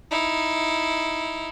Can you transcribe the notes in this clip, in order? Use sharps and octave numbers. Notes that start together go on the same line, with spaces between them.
D#4 E4